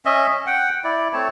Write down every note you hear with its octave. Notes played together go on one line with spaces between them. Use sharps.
C#4 D#5 E5
C#4
F#5 G5
E4 D5
A3 C4 C#5 A5